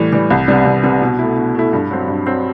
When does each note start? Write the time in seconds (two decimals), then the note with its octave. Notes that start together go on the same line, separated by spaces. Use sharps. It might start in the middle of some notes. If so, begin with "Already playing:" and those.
Already playing: A2 E3 G3
0.12 E3 G3
0.30 C2
0.48 C3 G3 B3
0.65 C2
0.84 C3 G3 B3
1.02 B2
1.19 A3 E4
1.36 B2
1.55 A3 E4
1.73 G2
1.90 F#3 C4
2.08 G2
2.26 F#3 C4